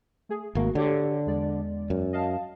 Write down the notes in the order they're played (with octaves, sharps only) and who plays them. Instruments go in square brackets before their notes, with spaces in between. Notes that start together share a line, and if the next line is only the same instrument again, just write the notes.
[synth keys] A3 G#4
[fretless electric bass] G#1 A#3 [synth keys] A3 F#4
[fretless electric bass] D3 [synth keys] G4 A4 C#5
[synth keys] E2 G#3 D5
[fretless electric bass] F#2
[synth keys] D#5 F5 A5